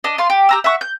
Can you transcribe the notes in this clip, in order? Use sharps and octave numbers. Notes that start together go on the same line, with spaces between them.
D4 D#5
F4 C6
G4
G4 A#5 E6
E5 F#5 C#6
G6